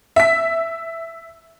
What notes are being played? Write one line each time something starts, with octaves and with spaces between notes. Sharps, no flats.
E5 B6